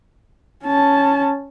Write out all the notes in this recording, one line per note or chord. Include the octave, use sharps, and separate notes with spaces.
C#4 A5